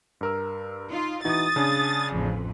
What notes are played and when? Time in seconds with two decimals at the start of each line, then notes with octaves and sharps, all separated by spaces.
0.21 G2 A#4 E6
0.89 D#4 F4
1.25 E3 D#4 F#4 D#6 A6
1.56 C#3 D4 G#4
2.12 A1 F2